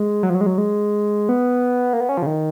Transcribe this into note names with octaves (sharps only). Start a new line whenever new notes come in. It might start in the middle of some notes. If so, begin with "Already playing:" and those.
Already playing: G#3
F#3
F3
F#3
G#3
F#3
G#3
B3
A#3
B3
C#4
F3
C#3
D#3